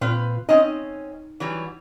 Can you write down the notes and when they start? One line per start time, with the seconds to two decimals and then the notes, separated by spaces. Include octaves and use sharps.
0.01 A#2 C4 F4 B4
0.49 C4 C#4 D#4 D#5
1.40 E3 F#3 G3